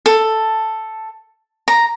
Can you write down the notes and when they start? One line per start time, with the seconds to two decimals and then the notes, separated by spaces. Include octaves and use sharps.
0.06 A4
1.68 A#5